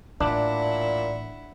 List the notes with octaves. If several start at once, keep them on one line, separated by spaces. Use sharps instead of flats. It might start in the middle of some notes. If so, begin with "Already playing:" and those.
A1 A#2 D4 E4 F#5